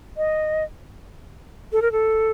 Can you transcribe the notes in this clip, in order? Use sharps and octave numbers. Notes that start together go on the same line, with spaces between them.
D#5
A4
A#4
A4